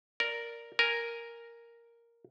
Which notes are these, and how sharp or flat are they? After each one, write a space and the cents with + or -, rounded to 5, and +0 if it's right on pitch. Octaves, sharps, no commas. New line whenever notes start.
A#4 +0 D5 +0
A#4 +0 G#5 +0